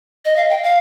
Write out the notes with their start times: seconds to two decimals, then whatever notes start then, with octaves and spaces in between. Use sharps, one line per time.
0.25 D#5
0.36 F5
0.50 G5
0.63 F5